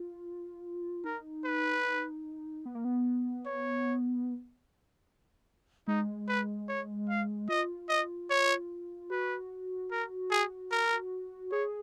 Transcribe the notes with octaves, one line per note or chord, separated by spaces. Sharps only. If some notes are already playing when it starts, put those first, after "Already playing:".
Already playing: F4
D#4 A#4
B4
B3
A#3
B3
C#5
G#3 D#4
B4
C#5
F5
F4 D#5
D#5
C#5
F#4 B4
A#4
G#4
A#4
G#4 C#5